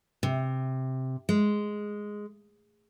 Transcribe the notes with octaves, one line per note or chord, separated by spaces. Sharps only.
C3
G#3